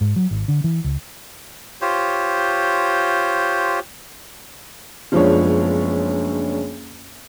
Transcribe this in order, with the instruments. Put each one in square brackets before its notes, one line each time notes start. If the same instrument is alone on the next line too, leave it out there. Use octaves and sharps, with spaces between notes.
[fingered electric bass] G#2
F#3
G#1
D3
E3
C#2
[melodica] F4 G4 C5 C#5
[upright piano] F#1 F3 G#3 B3 D4 C#5